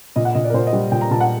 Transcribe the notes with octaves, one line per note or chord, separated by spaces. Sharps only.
A#2 D#5
F#5
A#2 D#5
D5
A#4
A#2 C5
D#5
G3
A#2 G5
A#5
A#2 A5
F#5